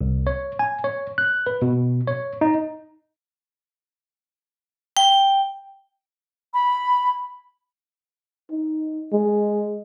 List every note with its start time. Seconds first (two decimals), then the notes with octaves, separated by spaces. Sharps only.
0.01 C2
0.27 C#5
0.59 G#5
0.84 C#5
1.18 F#6
1.47 B4
1.62 B2
2.07 C#5
2.41 D#4
4.97 G5
6.54 B5
8.50 D#4
9.13 G#3